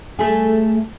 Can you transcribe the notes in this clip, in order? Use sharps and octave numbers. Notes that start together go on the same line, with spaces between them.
A3 G#4